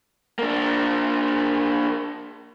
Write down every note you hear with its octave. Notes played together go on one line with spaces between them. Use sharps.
A#3 D4